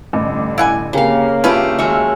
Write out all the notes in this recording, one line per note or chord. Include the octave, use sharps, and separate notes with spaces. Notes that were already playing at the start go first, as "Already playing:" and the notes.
A1 G2 D3
E4 F#5 G#5
C#3 A#3 C4 G4 A#4 F5
G2 A3 C#4 F4 G4 B4
D#2 F#3 G#3 C#5 E5 E6 F6